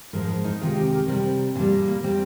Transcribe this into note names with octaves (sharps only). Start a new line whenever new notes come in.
G#2 F3 G#3 A#4
A#4
D#4
C3 D#3 G#3 F4
G4
A#4
C3 G3 A#4
A#2 G3 D4
A#3
A#3
A#2 G3 C4